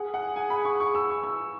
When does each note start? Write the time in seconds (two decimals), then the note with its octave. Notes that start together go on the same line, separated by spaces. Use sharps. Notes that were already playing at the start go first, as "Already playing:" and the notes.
Already playing: G#4 F#5
0.14 F#5
0.36 G#5
0.50 B5
0.65 C#6
0.80 C#6
0.95 E6
1.10 C#6
1.24 E6